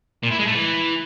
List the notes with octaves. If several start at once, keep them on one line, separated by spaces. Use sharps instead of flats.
A#2
E4
G#3
A3
E3